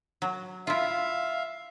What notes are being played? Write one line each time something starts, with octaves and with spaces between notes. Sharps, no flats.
F#3
E4 F4 E5 F5